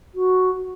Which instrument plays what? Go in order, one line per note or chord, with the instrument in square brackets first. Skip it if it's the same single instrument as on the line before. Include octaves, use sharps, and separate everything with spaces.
[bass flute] F#4